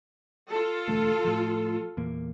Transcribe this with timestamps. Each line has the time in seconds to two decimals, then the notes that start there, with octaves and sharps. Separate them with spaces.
0.51 F4 A4
0.88 E1 D2 A3
1.24 A2 F3
1.97 E2 A#2 A#3